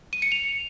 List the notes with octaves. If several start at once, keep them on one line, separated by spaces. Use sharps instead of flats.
D#7
C#7
F7